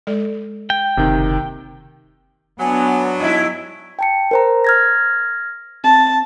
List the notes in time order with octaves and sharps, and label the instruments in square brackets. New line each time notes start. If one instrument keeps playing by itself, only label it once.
[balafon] G#3 A4 D5
[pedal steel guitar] G5
[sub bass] F#1 [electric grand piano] C3 D#3
[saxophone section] F#3 [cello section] B3 D4 [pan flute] G#5
[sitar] G2 E4 [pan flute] D#5
[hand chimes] G5 A5 C#7
A#4 C5 A#5
F6 G#6 A#6
[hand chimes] C4 [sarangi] A5